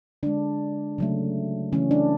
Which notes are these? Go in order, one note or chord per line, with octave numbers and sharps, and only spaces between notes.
D3 G#3 D4
C#3 F#3 A3
C#3 E3 A3 C#4
D4